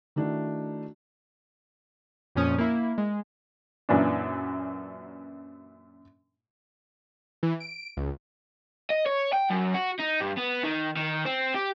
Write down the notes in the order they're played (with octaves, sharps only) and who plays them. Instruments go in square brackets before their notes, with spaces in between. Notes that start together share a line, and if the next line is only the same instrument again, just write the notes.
[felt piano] D#3 A3 D4 E4 F#4
[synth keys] F2 A#2 F3 C#4 D#6
A#3 E4
G#3
[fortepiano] F#2 A#2 E3 D4
[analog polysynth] E3
D7
C#2
[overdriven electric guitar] D#5
C#5
G5
F#2
F#4
D#4
G2
B3
D#3
D#3
C4
G4